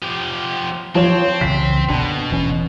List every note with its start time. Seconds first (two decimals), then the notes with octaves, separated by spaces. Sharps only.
0.03 F3 G4
0.95 F3 C4 C#5 E7
1.41 C2 C#3 E3 B6
1.89 F#1 B2 D3 D4
2.31 D#1 E3 C#4